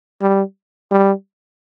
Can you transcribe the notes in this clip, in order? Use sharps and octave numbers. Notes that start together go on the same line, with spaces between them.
G3
G3